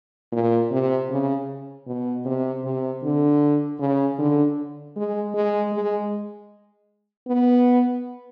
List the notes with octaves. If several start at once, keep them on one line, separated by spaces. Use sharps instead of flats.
A#2
C3
C#3
B2
C3
C3
D3
C#3
D3
G#3
G#3
G#3
B3